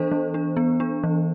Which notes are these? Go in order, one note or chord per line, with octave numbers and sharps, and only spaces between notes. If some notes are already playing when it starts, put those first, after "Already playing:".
Already playing: E3 B3 D4 A4 C5
E3
D4
B3
D4
E3